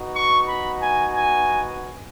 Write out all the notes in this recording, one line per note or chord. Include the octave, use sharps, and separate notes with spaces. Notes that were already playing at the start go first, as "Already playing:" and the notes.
Already playing: B3 D#4 F#4
C#6
B5
G#5
G#5